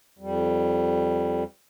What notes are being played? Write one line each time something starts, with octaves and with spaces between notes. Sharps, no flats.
F2 G3